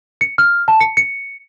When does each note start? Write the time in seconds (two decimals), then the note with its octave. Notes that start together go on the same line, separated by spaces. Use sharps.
0.21 C#7
0.38 F6
0.68 A5
0.81 C#7
0.97 C#7